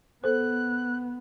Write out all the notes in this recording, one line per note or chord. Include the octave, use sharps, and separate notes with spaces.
B3 A4 C5 F#6